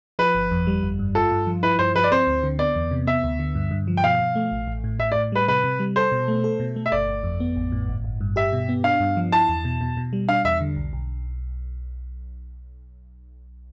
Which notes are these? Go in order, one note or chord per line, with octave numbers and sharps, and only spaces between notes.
F3 B4
G1
F2
G3
G1
G2
F4 A4
G2
F3
E4 B4
G2 C5
F3 B4
D5
C4 C5
D2
D3
B3 D5
E2
C3
B3 E5
D2
D3
G2
G2
F3
G5
B2 F5
B2
A3
A1
A1
A2
A2 E5
D5
A2
G3 B4
C3 B4
C3
G3
A4 C5
B2
A3
A4
B2
A3
E5
G1 D5
G1
F2
B3
A1
A2
G1
G1
G2
G4 E5
B2
B3
D4 F5
G2
F3
E4 A5
E2
B2
B2
B2
G3
D4 F5
E2 E5
D3
B1
B1